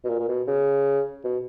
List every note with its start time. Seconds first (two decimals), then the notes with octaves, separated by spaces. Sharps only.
0.05 B2
0.10 A#2
0.20 A#2
0.28 B2
0.47 C#3
1.24 B2